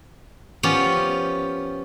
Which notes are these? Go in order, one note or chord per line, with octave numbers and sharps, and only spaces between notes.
F3 B3 C#4 G4